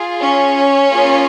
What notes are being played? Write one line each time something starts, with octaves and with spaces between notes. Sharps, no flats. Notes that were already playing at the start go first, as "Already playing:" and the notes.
Already playing: F4 G#4
C#4 C#5
A#3 F4 G#4